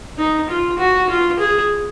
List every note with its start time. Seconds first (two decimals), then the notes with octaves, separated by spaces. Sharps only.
0.18 D#4
0.49 F4
0.78 F#4
1.09 F4
1.39 G#4